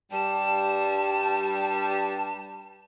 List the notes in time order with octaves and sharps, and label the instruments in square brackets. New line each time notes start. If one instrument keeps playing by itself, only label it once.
[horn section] G2 G3 [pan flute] A5